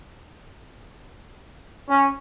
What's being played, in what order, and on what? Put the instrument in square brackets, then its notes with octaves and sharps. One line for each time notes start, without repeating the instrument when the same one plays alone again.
[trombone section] C#4